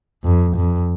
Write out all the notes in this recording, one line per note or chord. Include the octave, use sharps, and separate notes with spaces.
F2
F2